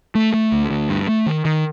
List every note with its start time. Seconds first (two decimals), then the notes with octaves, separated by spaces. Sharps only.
0.15 A3
0.34 A3
0.52 D2
0.71 D2
0.89 G2
1.08 A3
1.26 D#3
1.45 D#3